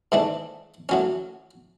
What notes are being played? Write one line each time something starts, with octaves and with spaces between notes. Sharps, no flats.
G#2 E3 A3 D4
A2 F#3 C#4